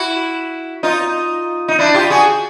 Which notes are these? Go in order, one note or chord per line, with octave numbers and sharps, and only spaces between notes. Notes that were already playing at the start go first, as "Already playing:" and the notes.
Already playing: E4 F#4
D#4 F4
D#4
D4 E4
F4 G4
F#4 G#4